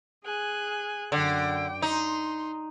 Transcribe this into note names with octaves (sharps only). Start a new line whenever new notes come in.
G#4 G#5 F#6
F#2 D3 G5
D#4 C6